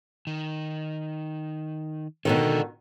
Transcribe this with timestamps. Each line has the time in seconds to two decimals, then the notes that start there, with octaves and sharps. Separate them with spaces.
0.27 D#3
2.25 B2 D3 D#3 G#3 A4